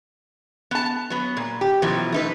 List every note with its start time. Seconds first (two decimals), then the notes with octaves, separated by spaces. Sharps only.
0.71 B3 A5
1.10 F#3 B3
1.37 A#2
1.61 G4
1.82 F#2 B2 E3 F3
2.12 A3 D#4 B4